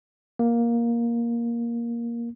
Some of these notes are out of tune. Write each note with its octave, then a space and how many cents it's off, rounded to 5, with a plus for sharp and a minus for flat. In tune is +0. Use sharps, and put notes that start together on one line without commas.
A#3 +10